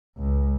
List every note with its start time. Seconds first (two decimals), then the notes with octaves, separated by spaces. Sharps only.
0.17 C#2